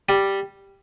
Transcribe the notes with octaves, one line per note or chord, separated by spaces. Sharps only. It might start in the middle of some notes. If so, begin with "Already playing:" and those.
G3